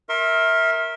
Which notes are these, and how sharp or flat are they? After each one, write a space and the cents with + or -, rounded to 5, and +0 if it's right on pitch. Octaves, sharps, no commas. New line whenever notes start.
A#4 +5 E5 -15 C6 +45